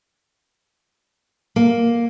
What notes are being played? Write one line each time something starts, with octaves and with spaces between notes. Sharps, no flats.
A#3